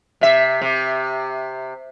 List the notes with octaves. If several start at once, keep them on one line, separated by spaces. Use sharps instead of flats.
C3 E5
C3